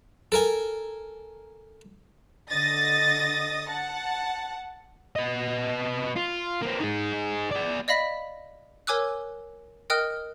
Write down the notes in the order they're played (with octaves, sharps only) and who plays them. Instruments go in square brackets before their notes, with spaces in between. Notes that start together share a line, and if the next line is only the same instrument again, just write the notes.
[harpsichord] A4 A#4 G#5
[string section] D3 D#5 D#6 A6 A#6
F#5 A5
[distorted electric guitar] B3 D#5
F4
A#3 C4
D#4 G#4
G#4 D5
[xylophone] D5 D#5 F5 B5 B6
A#4 C#5 G#5 D6 E6 F#6
A#4 D#5 G5 D#6 F6 F#6